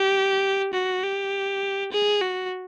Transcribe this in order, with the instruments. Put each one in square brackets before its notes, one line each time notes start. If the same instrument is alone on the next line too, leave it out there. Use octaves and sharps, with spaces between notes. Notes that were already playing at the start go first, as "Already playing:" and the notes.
Already playing: [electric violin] G4
F#4
G4
G#4
F#4